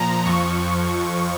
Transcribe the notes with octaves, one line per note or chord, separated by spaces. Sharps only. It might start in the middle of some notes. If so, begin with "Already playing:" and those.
Already playing: A#2 F3 A#5
F2 F3 C#6